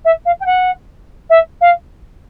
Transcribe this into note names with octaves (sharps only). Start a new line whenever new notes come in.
E5
F5
G5
F#5
E5
F5